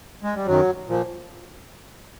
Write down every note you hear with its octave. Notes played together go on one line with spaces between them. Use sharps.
G#3
G3
F#2 D#3 F#3
A#2 F3